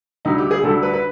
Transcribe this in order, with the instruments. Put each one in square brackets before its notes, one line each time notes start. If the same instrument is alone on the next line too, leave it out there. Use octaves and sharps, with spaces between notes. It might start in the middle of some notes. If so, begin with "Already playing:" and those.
[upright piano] D2 D3 G3 D#4
G4
G#4
D2 D3 G3 A4
B4
B4